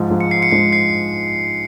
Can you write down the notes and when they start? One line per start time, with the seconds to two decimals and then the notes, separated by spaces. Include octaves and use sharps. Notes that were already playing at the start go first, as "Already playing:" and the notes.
Already playing: G#2 F3 G#3
0.10 G#2 F3 G#3
0.20 C#7
0.31 C7
0.42 C#7
0.51 G#2 F3 G#3 C7
0.73 C7